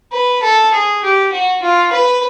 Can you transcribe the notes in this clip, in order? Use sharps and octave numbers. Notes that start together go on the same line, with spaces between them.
B4
A4
G#4
G4
F#4
F4
B4